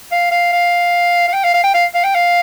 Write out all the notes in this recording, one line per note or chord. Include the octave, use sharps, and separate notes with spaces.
F5
F5
F5
F5
G5
F5
F5
G5
F5
F5
G5
F5